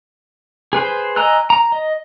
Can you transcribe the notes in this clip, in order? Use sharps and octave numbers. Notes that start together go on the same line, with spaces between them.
G#4 B4 C5
D#5 G#5 A#5 E6 F#6
A#5
D#5